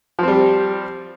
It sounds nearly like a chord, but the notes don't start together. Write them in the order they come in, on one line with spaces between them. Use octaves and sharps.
F3 C4 G3 G4